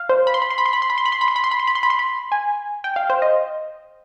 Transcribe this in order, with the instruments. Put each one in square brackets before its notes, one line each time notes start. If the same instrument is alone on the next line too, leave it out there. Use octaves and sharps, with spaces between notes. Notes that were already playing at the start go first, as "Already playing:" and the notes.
Already playing: [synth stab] F5
C5
B5
C6
B5
C6
B5
C6
B5
C6
B5
C6
B5
C6
B5
C6
B5
C6
B5
C6
B5
C6
B5
C6
B5
G#5
G5
F5
C5
D#5